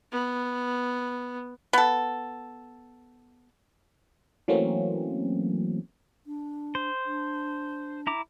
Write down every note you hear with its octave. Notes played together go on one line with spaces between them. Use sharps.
B3
B3 A4
E3 F#3 A3 A#3 C4 C#4
D4
C5
D4
E4 A#5 D6